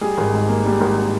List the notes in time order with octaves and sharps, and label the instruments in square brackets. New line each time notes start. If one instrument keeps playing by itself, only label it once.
[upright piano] G3 G#4
G#1
G#2
A#3
G3
G#1